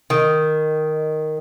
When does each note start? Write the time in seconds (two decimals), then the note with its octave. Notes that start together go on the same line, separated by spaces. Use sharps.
0.10 D#3